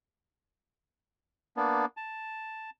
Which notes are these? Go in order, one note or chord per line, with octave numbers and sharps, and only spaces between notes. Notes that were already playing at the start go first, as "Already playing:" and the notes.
A#3 B3 D4
A5